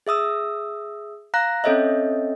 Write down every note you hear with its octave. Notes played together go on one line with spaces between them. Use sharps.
G#4 E5 D#6 E6
F5 A#5 F#6 A#6
C4 C#4 A4 C#5 D#5 E5